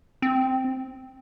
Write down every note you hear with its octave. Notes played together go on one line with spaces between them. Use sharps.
C4